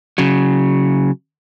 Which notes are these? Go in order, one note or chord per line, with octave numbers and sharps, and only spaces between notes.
C#3 F#3